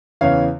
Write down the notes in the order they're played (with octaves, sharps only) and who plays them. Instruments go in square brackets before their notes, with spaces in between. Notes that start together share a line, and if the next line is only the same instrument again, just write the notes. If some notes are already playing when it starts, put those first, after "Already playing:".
[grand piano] E2 C#3 E3 C#5 F5